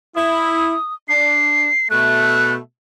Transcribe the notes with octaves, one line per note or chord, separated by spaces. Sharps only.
E4 D#6
D4 C7
B2 A3 F#6